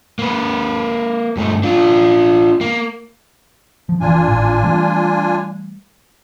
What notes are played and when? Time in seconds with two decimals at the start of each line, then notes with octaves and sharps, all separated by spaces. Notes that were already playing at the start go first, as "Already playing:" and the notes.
0.19 A#3 B4
1.37 G2 A3
1.63 D4 F4
2.61 A#3
3.89 F3
4.01 F#1 B2 E3 D4 F4 G#5
4.28 G#1 A2
4.63 E3 G3 A3